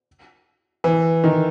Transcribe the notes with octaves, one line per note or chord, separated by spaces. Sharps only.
E3
D#3